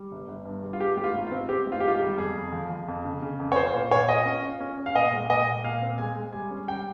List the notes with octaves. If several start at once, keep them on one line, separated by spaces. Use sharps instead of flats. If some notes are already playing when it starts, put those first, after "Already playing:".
Already playing: G3
G1
G1
G2
G3
F4
G2 G4
G#1 G4
F4
G#1
F4
C4
C4 G4
G#1
F4
G4
G#1 F4
G4
G3
F2 G#4
F2
F3
F3
F2
C#3
C#3
F2
C#5
F4 C5
A#2 C5
A#2 C#5
F4 D#5
C#4
F4
C#4
C#4
F5
A#2 D#5
G#3
A#2 D#5
A#2
A#2 F5
C4
G#3 G#5
G#3
G3 G#5
C#4
G3 G5